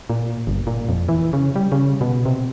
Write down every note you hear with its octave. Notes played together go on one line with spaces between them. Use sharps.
A#2
G1
A#2
F2
E3
C#3
G3
C#3
B2
C3